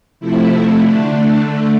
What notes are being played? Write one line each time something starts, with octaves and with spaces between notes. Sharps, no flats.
C3 F3 A3 E4
D3 A3 D4
D3 A3